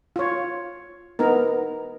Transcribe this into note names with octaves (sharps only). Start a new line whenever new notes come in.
F4 C#5
B3 D#4 A#4